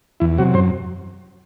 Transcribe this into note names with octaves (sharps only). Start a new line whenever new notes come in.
E2 E4
C3 F#3 F#4
F#2 C5